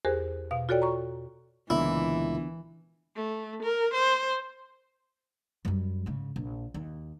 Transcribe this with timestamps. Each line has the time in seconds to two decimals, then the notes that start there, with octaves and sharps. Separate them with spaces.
0.05 E2 G4 G#4 A#4 C5 F#6
0.51 B2 F5
0.69 F4 F#4 A4 C#5 D5 G5
0.82 A#5 C#6
1.70 C#2 A#2 D3 E3 B3 D4 E4
3.16 A3
3.63 A#4
3.94 C5
5.65 F#2 G3
6.06 G#2 C#3
6.36 A#1
6.74 D#2